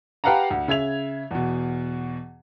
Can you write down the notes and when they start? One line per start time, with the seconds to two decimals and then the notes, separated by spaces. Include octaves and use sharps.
0.24 G4 B4 F5 F#5 A5 A#5
0.51 D2
0.68 C#3 E5 G#6 F7
1.31 E2 B2